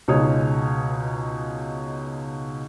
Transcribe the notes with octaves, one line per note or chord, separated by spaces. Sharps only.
C#2 B2 G#3 D#4 C#5 D#6